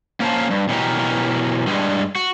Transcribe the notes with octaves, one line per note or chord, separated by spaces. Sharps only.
A#3 C#4 A#4 C5 F5 A5
G2
B2 E3 F#3 G4 A#4
G2 G3 G#3
F#4